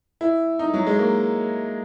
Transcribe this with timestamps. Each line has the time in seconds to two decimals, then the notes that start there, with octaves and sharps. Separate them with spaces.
0.21 E4
0.59 D#4
0.74 F#3
0.87 G#3
0.99 A#3